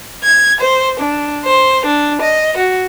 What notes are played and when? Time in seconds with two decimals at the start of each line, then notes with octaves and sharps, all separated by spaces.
0.23 G#6
0.59 C5
0.99 D4
1.44 C5
1.85 D4
2.21 D#5
2.56 F#4